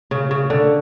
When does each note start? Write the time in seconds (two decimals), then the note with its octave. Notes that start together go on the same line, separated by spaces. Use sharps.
0.11 C#3
0.31 C#3
0.50 D3